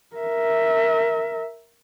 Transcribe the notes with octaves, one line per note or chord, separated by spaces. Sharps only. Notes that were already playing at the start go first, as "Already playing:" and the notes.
A#4 E5